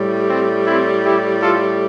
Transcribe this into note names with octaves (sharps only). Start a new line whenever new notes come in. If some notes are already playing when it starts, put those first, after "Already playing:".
Already playing: A2 G3
C4
C4 E4
E4 G4
F4 A4